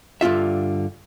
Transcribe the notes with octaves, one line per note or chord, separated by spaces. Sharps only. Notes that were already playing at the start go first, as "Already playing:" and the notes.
G2 D3 F4 E5